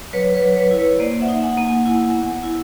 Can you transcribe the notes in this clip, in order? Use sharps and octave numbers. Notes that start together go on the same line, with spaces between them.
F#3 B4 C#5
B4 C#5
F#3
B4 C#5
E4
B4 C#5
A#3 C5 D5
E5 F#5
D#4
F#5 G#5
A#3
F#5 G#5
E4
B3
E4